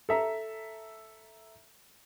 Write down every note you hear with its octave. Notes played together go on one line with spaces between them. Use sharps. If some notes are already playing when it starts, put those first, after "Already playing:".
A4 E5 A#5